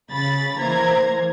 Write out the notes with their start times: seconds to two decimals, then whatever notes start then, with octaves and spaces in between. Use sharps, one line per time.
0.11 C#3 B5 A6
0.59 E3 A#3 C5 A#5 G#6